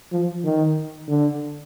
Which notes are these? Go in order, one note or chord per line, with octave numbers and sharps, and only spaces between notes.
F3
D#3
D3